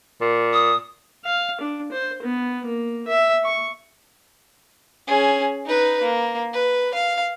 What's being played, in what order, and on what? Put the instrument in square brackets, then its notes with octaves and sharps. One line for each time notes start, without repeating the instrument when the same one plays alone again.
[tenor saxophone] A#2
[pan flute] D#6
[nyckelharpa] F5
D4
C5
B3
A#3
E5
C#6
[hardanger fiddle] C#4 G#4
D#4 B4
A#3
B4
F5